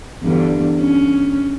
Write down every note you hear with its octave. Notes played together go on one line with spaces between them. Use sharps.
E2 G2 D3
C#4